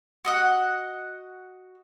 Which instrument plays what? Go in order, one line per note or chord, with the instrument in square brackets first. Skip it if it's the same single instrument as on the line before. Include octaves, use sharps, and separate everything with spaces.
[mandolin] F#4 D#5 F#5